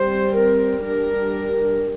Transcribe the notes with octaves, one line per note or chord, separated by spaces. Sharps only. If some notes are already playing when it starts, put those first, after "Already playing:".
Already playing: G3 C4 C5
A#4
G3 D4 A#4